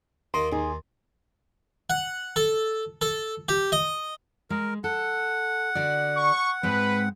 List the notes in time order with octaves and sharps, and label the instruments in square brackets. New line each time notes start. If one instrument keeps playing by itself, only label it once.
[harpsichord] D#2 A#3 D#5 [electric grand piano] C6
[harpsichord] D#2 [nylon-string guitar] D#4 G#4
[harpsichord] F#5
A4
A4
G4
D#5
[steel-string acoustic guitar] G#3 [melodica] A#4
[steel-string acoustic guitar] A4 [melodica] F#5
[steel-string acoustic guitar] D3 F#4 D5
[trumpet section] C#6
[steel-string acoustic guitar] G#2 G#3 C4 [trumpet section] B4